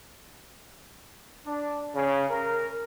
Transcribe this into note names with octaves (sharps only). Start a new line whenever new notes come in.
D4
C#3
A#4